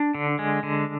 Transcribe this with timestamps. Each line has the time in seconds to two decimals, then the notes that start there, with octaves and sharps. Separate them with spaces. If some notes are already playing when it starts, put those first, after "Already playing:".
Already playing: D4
0.14 D3
0.39 G#3
0.63 D3